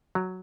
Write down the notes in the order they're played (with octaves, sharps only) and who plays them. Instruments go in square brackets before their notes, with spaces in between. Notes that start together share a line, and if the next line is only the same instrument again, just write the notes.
[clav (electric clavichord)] F#3